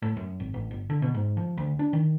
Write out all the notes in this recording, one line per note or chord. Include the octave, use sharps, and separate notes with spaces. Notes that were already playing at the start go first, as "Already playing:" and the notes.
A2
F#2
G#1
A1
G1
D3
B2
G#2
F3
D2
D4
D#3